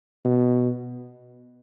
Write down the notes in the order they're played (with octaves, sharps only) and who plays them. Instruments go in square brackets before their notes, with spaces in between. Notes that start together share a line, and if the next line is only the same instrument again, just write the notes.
[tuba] B2